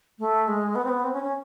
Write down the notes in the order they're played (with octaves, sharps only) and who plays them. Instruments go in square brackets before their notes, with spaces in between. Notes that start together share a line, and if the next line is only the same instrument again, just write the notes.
[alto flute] A3
G#3
B3
C4
B3
C4
C#4
C#4